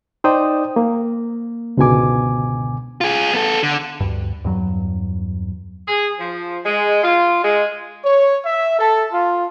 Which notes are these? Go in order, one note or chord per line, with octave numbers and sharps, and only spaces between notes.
D#4 C5 D5 G5 D#6
A#3
C#2 G#2 B2 D3 G#5 D6
F4 G#4
B3 A4
D3
D2 G2
E2 G2 F#3
G#4
F3
G#3
F4
G#3
C#5
E5
A4
F4